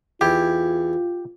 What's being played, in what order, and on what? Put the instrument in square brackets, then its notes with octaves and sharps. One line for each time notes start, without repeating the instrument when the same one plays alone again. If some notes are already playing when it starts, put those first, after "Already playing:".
[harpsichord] E2 E4 [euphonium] F4 [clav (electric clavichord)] G4